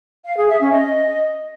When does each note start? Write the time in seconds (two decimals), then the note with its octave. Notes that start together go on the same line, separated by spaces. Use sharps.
0.25 F5
0.36 G#4
0.48 E5
0.60 C#4
0.72 D#5